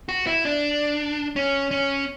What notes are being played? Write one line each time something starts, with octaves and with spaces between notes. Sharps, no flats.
F#4
E4
D4
C#4
C#4